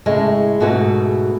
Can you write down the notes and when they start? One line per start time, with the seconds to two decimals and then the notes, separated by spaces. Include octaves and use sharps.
0.06 A2 C#3 G#3 A3
0.60 G#2 B2 A3 F#4 G#4 B4